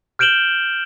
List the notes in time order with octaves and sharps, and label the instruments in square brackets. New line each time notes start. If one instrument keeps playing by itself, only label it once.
[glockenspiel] F6 G6 D7 E7 F#7 G7